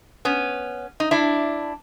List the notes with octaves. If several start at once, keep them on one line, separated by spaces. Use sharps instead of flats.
B3 C#4
D#4
D4 E4